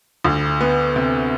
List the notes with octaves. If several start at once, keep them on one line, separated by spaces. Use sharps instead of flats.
D2
B3
C3